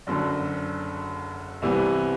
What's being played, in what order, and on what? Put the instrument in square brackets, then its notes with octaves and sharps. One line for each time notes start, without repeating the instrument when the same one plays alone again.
[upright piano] F#1 F#2 D3
C2 C3 E3 B3